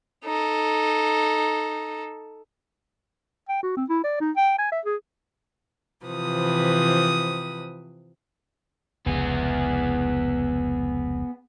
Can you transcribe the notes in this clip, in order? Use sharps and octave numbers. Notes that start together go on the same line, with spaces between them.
D#4 A4
G5
F#4
C4
E4
D5
D#4
G5
G#5
E5
G#4
C3 E3 F3 B4 D#6
F1 C#2 B3 G#4